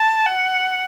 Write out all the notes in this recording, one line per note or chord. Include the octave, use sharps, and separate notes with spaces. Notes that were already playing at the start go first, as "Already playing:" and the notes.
Already playing: A5
F#5